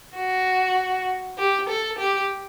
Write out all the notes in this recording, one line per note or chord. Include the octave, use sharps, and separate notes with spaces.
F#4
G4
A4
G4